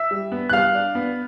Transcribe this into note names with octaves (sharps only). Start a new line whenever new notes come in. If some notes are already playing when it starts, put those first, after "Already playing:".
Already playing: E5 E6
G3
B3
F#6
G3 F5 F6
D4
B3